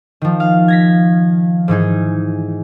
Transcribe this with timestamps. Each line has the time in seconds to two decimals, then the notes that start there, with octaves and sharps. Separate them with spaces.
0.21 D#3 F3
0.40 F5
0.68 G#6 A#6 B6
1.68 G#2 E3 D#4 G#4